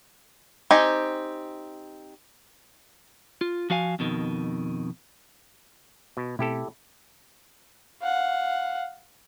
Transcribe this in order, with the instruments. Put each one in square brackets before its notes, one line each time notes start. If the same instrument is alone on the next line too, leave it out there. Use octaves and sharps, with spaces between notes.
[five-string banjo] C4 D#4 G4 G#5
[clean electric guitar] F4
F3 F#4 F5 G#5
F2 B2 D#3
[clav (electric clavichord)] B2
[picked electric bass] B2 A3 C4 [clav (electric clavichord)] E4 G4 A4
[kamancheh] F5 F#5